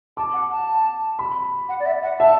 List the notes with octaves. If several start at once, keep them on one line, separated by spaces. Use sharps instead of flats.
A5 D6
F#5
A5
B5
F#5
D5
E5
F#5
E5 A5